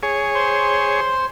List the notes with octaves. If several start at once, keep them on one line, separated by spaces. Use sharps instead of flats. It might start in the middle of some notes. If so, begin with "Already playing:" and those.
G#4 C#5
C5 C6